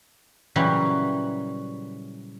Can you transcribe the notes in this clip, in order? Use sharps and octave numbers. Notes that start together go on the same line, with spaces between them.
A#2 C#3 E3 F#3 G3 F#4